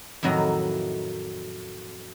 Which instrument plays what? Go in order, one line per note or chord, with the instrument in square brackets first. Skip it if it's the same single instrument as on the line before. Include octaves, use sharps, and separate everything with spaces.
[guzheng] F2 A2 D#3 F#3 E4 A#5